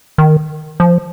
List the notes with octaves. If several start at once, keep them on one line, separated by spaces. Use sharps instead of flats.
D#3
F3